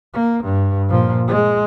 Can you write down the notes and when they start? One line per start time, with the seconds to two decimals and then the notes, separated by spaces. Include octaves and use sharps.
0.13 A#3
0.44 G2
0.88 A#2 F3
1.28 G#3